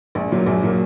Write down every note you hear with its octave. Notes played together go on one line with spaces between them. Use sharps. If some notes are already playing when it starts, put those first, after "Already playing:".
A#1
A#2 F#3 A#3
A#1
A#2 F#3 A#3